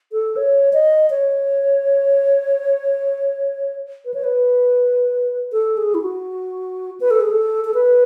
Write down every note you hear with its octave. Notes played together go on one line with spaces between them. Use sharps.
A4
C#5
D#5
C#5
B4
C#5
B4
A4
G#4
E4
F#4
B4
A4
G#4
A4
A4
B4